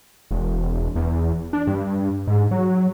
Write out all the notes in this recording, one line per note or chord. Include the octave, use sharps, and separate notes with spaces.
E1
E2
D4
G2
G#2
F#3